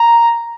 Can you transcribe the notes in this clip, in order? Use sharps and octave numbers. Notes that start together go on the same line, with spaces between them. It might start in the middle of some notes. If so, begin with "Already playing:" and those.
Already playing: A#5